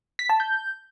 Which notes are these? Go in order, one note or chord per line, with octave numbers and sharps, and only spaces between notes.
B6
A5
G6